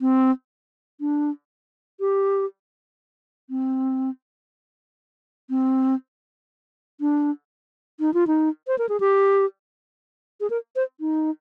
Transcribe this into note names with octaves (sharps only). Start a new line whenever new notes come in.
C4
D4
G4
C4
C4
D4
D#4
F4
D#4
C5
A#4
G#4
G4
G#4
A#4
C5
D#4